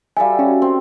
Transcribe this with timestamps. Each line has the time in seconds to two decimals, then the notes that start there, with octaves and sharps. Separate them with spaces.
0.17 G3 A4 E5 F5 G#5
0.39 C#4 F#4
0.62 C4